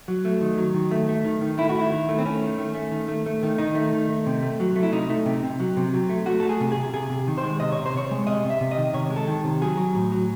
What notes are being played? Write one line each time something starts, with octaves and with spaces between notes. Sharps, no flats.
F#3
A3
D#3
F#3
D#3
A3
A3
D#3
D#3
A3 E4
F#4
D#3 E4
D#3
A3
C4
A3 C#4
D#3
A3
A3
D#3
A3
A3
D#3
D#3 D#4
A3
D#3
A3
C3
A3
F#3
A3
E4
C3 D#4
A3
C3
C3
F#3
C3
F#3
A3
A3 F#4
A3 A4
G#4
C3
C3 G#4
C3 G#4
C3
D#3
C5
G#3
C3 D#5
C3 C#5
C5
C3 C#5
G#3
C3 D#5
C3
E5
C3
D#5
D#3
C3 C#5
G#3
A4
D#3
C3
F#3 G#4
F#3
A2
F#3